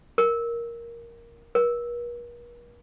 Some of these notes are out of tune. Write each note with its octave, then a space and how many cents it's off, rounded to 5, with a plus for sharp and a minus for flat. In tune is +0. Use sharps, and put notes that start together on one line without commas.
A#4 +5
A#4 +45